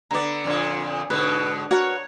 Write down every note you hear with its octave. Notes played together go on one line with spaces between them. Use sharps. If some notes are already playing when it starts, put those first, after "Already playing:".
D3 B3 D5 A#5
F2 A#2 D3
G#2 B2 D3 B4
F#4 A#4 B4 C#5